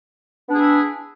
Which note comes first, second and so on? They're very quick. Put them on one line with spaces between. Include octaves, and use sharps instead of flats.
B3 D4 G#4 E4